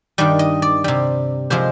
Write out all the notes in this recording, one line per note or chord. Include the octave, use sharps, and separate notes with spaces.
G2 D#3 G3 D5
D#5
D5
C3 G3
C3 F3 G#3 C5